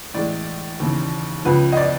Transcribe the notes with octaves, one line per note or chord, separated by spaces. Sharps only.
A2 E3 G#3 D5
D#2 C#3 E3
C#2 C#3 F3 B4
D#5
D5